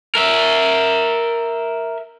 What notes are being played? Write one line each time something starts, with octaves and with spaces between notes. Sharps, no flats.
A#4 E5